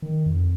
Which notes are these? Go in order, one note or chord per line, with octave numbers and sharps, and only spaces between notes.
D#3
F2